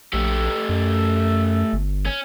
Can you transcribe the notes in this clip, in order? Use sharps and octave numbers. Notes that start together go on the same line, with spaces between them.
A#1 A3 G4
F#2
G1
C#4